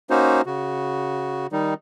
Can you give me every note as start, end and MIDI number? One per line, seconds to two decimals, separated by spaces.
0.10 0.42 58
0.10 0.42 61
0.10 0.42 63
0.10 0.42 66
0.10 0.42 72
0.46 1.47 49
0.46 1.47 66
1.52 1.74 51
1.52 1.74 55
1.52 1.74 63